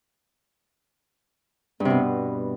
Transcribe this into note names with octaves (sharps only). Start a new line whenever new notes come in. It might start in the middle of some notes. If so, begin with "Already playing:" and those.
G2
C3
B2